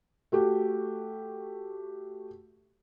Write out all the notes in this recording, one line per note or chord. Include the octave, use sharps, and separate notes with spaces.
A3 F#4 G4